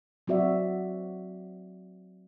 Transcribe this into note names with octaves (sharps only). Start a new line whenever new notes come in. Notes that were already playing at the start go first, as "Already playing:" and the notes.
F#3 C4 F#4 D5 E5